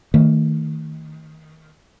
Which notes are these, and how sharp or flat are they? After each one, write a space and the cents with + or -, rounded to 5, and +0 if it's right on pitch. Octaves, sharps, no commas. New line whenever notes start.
D#3 +15 A3 +30